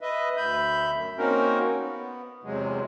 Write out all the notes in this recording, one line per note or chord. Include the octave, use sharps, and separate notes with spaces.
B4 D#5 E5
D2 E5 B5 G6
F#2
A#3 C4 C#4 D#4 F#4 A#4
B3
E2 C3 F#3 G#3